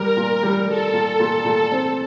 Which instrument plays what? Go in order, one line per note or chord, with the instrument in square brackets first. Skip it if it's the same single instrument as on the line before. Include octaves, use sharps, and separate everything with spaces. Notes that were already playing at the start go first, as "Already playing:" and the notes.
Already playing: [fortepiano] G3 [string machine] A#4
[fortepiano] A#2
G3
[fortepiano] G3 [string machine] A4
[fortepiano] A#2
A#2
A#2
C4